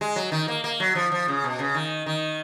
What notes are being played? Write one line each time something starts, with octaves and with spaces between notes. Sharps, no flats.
G#3
F#3
D#3
A#3
A#3
F#3
F3
F3
C#3
B2
C#3
D#3
D#3